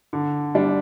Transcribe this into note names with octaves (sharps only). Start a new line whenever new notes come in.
D3
G3 D4